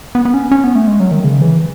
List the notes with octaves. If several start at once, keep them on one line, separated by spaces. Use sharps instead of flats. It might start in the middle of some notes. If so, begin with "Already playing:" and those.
B3
B3
C#4
C#4
B3
A3
G#3
F#3
D#3
C#3
E3